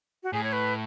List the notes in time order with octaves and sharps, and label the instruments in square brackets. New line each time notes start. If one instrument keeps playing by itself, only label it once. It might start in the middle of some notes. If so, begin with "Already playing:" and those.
[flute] F#4
[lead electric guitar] A2 [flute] G#4
[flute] C#5
B4